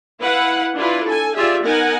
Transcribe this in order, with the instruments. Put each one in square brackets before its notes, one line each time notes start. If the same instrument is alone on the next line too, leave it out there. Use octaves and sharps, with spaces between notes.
[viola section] E4 B4 F5 F#5
D4 E4 F4 B4
A4 G#5
F4 G4 G#4 D5 E5
B3 D#4 A#4 F#5 G#5